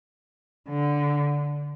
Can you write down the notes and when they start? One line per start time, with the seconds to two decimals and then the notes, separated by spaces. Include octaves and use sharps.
0.69 D3